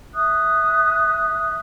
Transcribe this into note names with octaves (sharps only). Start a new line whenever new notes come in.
E5 D#6 F#6